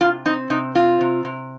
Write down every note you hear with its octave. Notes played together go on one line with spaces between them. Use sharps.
C3 F4
C4 D#4
C3 D#4
C4 F4
C3
C3